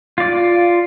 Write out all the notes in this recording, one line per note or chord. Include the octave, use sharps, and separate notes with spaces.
F4 D5